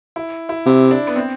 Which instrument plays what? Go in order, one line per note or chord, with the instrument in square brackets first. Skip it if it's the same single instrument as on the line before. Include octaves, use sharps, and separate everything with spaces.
[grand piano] E4
E4
[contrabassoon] C3 [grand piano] E4
[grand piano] D4
B3
C4